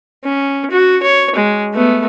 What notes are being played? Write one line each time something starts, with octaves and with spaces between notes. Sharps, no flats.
C#4
F#4
C#5
G#3
A3 B3